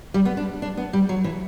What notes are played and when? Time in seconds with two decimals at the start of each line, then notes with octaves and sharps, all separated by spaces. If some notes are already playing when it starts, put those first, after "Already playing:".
0.14 G3
0.25 B3
0.37 D4
0.62 D4
0.77 B3
0.93 G3
1.09 F#3
1.24 E3